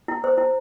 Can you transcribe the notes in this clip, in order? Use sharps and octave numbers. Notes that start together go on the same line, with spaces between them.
E4
C5
E4